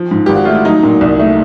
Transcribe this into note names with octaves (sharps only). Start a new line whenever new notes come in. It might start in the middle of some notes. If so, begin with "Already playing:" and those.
Already playing: F3
G#2
G#1 G4
F#4
A3 F4
E4
F#3 D#4
A#2
C2
A3